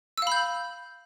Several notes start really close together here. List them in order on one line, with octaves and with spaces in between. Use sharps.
E6 F5 B5 G6